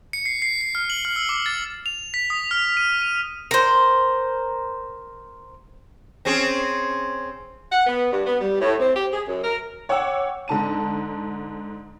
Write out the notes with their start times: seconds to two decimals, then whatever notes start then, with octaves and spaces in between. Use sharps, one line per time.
0.13 C#7
0.26 C7
0.42 C7
0.61 C7
0.75 F6
0.90 F#7
1.05 F6
1.16 E6
1.29 D6
1.46 A6
1.86 F7
2.14 B6
2.30 D#6
2.51 F6
2.77 D#7
3.02 D#7
3.51 A#4 C5
6.25 C4 C#4 G#4
7.72 F#5
7.87 B3
8.12 G2
8.26 B3
8.41 G3
8.59 A2
8.79 C4
8.95 G4
9.12 G#4
9.27 F#2
9.44 A#4
9.89 C#5 F#5 G5 D6 E6
10.48 G#2 D3 A5 D#7